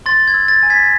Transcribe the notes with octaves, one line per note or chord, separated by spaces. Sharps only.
C6 A6
G#6
E6
A6
G#5
G#6 B6